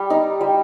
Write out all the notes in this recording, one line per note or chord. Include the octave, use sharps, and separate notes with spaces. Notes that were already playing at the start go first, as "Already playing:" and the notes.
Already playing: G3
D#4
G3